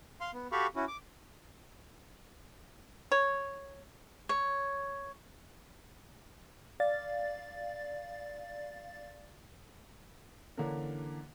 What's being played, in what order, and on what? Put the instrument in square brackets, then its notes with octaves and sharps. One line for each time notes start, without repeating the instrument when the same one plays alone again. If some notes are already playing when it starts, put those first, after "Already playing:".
[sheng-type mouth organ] F5 C6
B3
F#4 G4 A4 F5 B5 C#6
C#4 E4 F#4
D6
[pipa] C#5
[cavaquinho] C#5
[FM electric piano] D5 F5 A6
[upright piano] D3 E3 A#3 C#4 D4 A#4